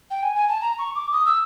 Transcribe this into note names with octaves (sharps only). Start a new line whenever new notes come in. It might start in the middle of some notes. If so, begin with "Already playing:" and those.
G5
G#5
G#5
A5
A#5
C#6
D6
D#6
E6